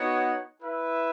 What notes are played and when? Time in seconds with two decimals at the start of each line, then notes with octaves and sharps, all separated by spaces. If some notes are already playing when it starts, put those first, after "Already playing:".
Already playing: B3 D#4 F#4 C#5 F#5
0.60 E4 B4 E5